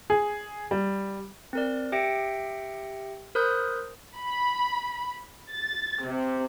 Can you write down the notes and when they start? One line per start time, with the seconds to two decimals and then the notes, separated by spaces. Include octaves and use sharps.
0.10 G#4
0.71 G3
1.53 C4 A#4 D5
1.92 G4 E5 G5 A#6 C#7 D7
3.35 A#4 C5 B5 D#6 F#6 G6
4.16 B5
5.52 A6
6.06 C3